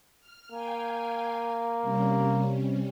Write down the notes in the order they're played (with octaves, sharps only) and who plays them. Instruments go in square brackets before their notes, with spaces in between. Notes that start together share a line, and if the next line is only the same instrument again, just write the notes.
[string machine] F6
[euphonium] A#3 [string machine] F5 G5 G#5
[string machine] C3 G3 C#4